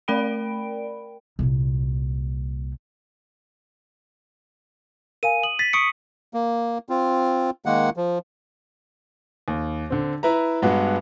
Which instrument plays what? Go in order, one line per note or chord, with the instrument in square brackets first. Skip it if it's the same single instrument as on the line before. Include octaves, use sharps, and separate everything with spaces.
[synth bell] A3 A#4 D5 G5 B5 D7
[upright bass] C2 A#2
[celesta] A#4 F5 G#5 [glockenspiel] D#7
[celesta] D#6 [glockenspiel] F#7
[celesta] A6 [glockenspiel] B6
[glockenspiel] C#6 D#6 C#7 [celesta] D7
[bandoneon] A#3
C4 F4
D#3 G#3 A#3 F#5
F3
[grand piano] D#2
D3 C4
E4 B4 E5 A#5
G2 G#3 B3 F#4